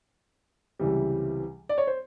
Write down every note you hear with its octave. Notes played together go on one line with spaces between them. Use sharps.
C#2 C3 E3 G3
D5
C#5
C5